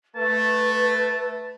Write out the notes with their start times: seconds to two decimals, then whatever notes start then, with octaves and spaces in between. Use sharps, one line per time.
0.16 A3 B4 A5